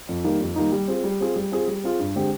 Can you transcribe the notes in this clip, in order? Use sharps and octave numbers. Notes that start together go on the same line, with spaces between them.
F2
D#3 G3 A#3 D#4
F2
D#3 G3 A#3 D#4
G3
C4 F4 G#4
G3
C4 F4 G#4
G3
C4 F4 G#4
G3
C4 F4 G#4
G2
D3 G#3 C4 G4